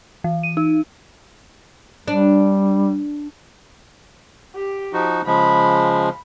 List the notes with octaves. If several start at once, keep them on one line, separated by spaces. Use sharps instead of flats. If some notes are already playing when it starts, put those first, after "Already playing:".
E3
D#7
D#4
G3 D4
G4
F3 D#4 F#4
C#3 F3 G#3 B5